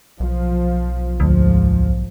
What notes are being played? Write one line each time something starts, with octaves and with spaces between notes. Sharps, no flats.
B1 F3
D2 G#2 F3